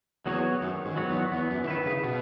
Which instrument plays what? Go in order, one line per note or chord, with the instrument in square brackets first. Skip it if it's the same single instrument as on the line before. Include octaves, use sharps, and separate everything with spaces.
[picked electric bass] E2 [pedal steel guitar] F#3 B3 F#4 C#5
[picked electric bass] F#2 [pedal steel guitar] D#3
[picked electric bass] G#2
[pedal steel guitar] F#3 B3 F#4 C#5
[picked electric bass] E2
[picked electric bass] E2 [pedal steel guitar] B3
[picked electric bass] F#2
E3
[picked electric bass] D#3 [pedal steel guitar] E4 B4
[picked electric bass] C#3
[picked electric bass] B2 [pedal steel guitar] B3